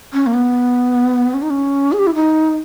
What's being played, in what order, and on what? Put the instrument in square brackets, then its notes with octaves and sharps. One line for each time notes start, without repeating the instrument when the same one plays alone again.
[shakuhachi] C#4
A#3
B3
C#4
D#4
C#4
G#4
G4
E4
D#4